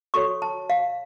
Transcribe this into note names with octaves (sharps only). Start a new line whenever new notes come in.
F#4 A4 C#5 C#6
A5
F5